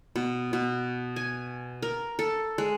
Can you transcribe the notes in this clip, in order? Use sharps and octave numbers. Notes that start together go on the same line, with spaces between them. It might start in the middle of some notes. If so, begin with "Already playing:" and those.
B2
B2
G#5
A#4
A4
G#3